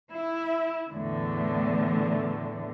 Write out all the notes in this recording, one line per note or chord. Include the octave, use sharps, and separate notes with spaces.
E4
E2 A2 D3